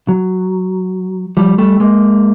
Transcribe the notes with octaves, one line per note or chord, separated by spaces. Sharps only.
F#3
F3 G3
G3 A3
G#3 A#3